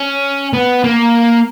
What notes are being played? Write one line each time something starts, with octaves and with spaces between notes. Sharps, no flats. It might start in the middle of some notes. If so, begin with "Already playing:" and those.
Already playing: C#4
B3
A#3